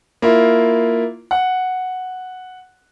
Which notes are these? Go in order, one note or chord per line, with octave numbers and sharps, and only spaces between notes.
A#3 E4 F4
F#5